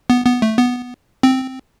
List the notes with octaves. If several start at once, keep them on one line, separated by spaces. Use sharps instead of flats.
B3
B3
A3
B3
C4